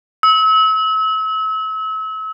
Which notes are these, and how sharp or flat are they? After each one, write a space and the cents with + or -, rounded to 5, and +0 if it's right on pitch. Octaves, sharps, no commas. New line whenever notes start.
E6 -35